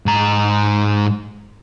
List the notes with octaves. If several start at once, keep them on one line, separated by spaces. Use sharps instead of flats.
G#2 A#5